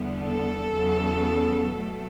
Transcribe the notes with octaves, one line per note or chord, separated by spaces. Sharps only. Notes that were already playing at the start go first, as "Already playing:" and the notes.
Already playing: E2 D3 G3 B3
A4
E2 C#3 F#3 B3
B2 F#3 A3